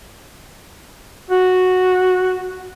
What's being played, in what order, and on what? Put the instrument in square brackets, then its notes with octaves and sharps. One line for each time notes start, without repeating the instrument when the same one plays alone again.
[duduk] F#4